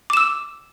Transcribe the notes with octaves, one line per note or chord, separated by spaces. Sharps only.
D6 E6 E7